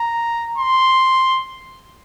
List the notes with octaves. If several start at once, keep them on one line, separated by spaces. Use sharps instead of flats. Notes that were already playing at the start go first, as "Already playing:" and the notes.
Already playing: A#5
C6